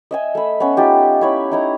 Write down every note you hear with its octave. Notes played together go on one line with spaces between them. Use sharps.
D#5 E5 G#5
A3 B5
B3 C#4
D#4 F4 G4
E4 C#5 B5
D#4 E4 A#5